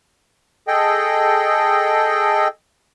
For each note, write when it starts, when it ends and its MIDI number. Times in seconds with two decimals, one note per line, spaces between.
0.68 2.48 68
0.68 2.48 69
0.68 2.48 75
0.68 2.48 79